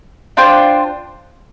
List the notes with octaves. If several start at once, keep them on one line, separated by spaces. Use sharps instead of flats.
D4 F4 C5 G5